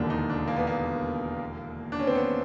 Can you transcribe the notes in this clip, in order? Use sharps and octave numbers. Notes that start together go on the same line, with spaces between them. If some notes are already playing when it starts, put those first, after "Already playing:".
Already playing: E1 D#2 D3 D4
D#4
D4
A#3
B3
A#3
D4
C#4
C4
B3